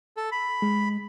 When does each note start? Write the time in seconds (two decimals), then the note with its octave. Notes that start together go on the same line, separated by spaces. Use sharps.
0.17 A4
0.32 B5
0.62 G#3